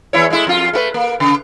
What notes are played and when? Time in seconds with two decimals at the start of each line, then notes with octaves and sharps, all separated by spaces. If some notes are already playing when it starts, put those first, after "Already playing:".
0.13 E2 E4 C#5
0.30 G#3 A3 E4
0.47 F2 F4
0.73 A3 F#4 B4
0.94 A#3
1.20 C#3